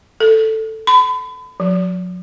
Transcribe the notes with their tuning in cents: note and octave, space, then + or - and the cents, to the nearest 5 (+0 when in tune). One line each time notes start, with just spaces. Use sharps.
A4 +5
B5 +35
F#3 -40